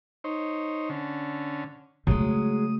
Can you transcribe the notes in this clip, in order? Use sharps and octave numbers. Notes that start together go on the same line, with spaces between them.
D#4 C5 C#5
D3 C#4
C#3 F#3 G#3 A3 D#6